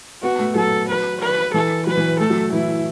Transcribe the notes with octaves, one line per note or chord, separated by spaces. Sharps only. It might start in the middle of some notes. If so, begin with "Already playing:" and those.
B3 F#4
A3
F#3 A4
B4
B4
E3 A4
F#3 B4
E3
A3 A4
F#3
E3 E4